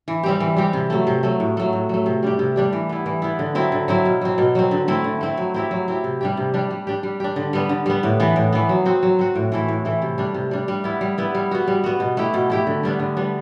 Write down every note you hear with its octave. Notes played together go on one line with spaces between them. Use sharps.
E3
G3 C4 G4
E3
G3 C4 G4
C3
F#3 A3
C3
F#3 A3
A2
F#3 A3
A2
F#3 A3
C3
G3 D4 G4
C3
G3 D4 G4
E3
B3 E4
E3
B3 E4
D3
F#3 C4 E4
D3
F#3 C4 E4
B2
F#3 C4
B2
F#3 C4
D3
A3 C4 E4
D3
A3 C4 E4
F#3
C4 E4 G4
F#3
C4 E4 G4
C3
G3 D4 G4
C3
G3 D4 G4
G3
D4 G4
G3
D4 G4
D3
G3 B3
D3
G3 B3
A2
E3 B3
A2
E3 B3
F#3
C4 F#4
F#3
C4 F#4
A2
E3 A3 E4
A2
E3 A3 E4
C3
G3 D4
C3
G3 D4
G3
B3 E4
G3
B3 E4
G3
B3 F#4
G3
B3 F#4
B2
A3 E4 G4
B2
A3 E4 G4
D3
G3 B3 D4
D3
G3 B3 D4